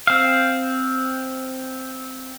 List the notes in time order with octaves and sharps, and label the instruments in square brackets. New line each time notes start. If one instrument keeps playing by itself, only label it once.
[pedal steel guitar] C4 F5